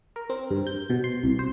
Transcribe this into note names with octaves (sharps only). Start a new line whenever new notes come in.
A#4
C4
G2
G6
B2
C6
C2
C5